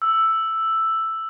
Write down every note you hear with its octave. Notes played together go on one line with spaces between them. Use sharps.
E6